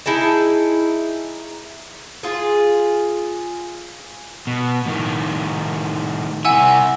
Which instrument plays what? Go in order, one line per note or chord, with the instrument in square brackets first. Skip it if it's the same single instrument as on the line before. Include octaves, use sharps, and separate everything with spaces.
[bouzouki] D#4 E4 G#4 A5
F4 G#4
[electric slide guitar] B2
A2 D#3
[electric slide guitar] C3 E4 [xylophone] F#5 G#5 E6